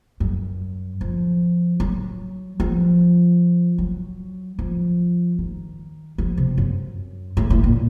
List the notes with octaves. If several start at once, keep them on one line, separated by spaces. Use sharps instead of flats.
F#2
F3
F#3
F3
F#3
F3
D#3
F3
C3
F#2
A2
A2
A#2